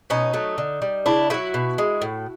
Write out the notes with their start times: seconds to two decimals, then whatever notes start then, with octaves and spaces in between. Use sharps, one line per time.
0.10 B2 C#4 D#4
0.34 F#3 A3
0.58 D3
0.82 G3
1.06 C#3 D4 E4
1.30 F#3 A3 E4 F#4
1.54 B2
1.78 G#3
2.02 A2